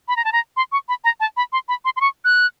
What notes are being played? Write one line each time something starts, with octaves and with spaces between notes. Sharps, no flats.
B5
A#5
A5
A#5
C6
C#6
B5
A#5
A5
B5
C6
B5
C6
C6
C#6
F#6